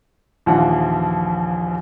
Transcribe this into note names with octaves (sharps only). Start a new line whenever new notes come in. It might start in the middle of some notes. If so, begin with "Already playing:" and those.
A#1 D#2 E3 F3 F4 F#5